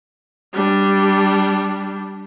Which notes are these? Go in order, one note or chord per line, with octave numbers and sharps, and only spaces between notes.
G3 D4